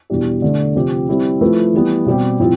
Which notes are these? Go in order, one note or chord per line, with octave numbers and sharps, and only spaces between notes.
E2 B2 G3 D4 G4
D3 A3 D4
C3 F3 C4 G4
G3 C4 E4
F3 A3 E4 B4
E3 G3 B3
B2 G3 C4 G4
A2 F3 C4